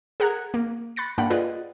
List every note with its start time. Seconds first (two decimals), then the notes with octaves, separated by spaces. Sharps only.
0.20 G#4 A#4 F#5 A#5 F#6 G#6
0.54 A#3
0.96 B5 F#6 A6 C#7
1.18 G2 A#3 D4 F#5 G5 B5
1.30 F4 G#4 B4 D5 D#5